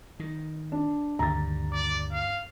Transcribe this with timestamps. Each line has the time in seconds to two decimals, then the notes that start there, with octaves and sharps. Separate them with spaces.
0.20 D#3
0.72 D4
1.19 D2 G2 D#3 A#5 A6
1.72 D5
2.13 F5